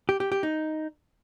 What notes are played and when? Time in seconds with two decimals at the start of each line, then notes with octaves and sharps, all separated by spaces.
0.09 G4
0.20 G4
0.32 G4
0.43 D#4